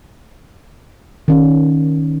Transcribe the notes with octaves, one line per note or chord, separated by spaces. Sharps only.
D#3 C#4